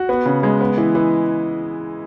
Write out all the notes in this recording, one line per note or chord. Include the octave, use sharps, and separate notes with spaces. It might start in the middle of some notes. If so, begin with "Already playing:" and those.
Already playing: F#4
B3
C#3
G#3
B3
E3
E3